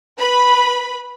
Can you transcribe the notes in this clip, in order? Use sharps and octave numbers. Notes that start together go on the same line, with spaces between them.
B4 B5